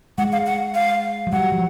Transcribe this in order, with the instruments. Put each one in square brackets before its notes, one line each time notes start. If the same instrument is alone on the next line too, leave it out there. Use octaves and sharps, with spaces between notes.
[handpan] G#3 [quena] F#5
[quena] F5
F#5
F5
[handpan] F#3
[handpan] G3 [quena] F#5
[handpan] F3